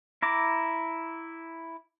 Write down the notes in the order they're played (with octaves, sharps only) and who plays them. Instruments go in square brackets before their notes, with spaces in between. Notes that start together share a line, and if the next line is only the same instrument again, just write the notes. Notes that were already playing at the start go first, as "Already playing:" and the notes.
[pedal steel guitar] E4 A#5 D6